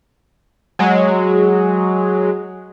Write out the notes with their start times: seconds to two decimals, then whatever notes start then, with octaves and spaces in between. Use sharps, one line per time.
0.79 F#3 G#3